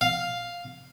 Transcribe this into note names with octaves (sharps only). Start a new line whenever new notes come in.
F5